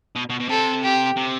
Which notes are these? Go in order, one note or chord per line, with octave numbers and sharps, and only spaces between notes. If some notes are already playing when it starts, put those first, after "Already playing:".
B2
B2
B2
C3 A4
G4
C3